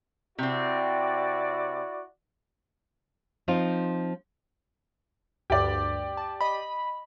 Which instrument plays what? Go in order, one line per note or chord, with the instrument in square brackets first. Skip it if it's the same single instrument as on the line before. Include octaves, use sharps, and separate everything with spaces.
[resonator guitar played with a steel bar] C3 C4 [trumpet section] E4 F#4 D5
[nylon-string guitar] F3 C4 D#4 F4
[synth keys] D2 G2 [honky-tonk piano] G4 D5
[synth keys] A5
D#5 B5